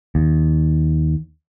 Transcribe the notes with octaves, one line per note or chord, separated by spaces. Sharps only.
D#2